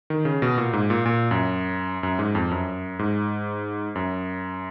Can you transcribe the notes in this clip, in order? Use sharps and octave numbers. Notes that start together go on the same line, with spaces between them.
D#3
C#3
B2
A#2
G#2
A#2
A#2
F#2
F#2
G#2
F2
F#2
G#2
F#2